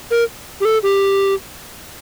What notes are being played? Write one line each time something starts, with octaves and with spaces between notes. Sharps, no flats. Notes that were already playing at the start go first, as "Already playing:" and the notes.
A#4
G4
A4
G4